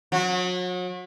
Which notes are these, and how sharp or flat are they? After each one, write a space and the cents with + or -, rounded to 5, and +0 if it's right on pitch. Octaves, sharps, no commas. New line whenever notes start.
F#3 -35